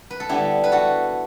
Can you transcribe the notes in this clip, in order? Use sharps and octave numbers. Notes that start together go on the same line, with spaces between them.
B4
A4
D3 G3 B3 E4 G4
B4
F#4 A4